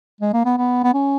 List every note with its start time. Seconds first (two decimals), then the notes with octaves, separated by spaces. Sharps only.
0.21 G#3
0.33 A#3
0.45 B3
0.58 B3
0.84 B3
0.94 C#4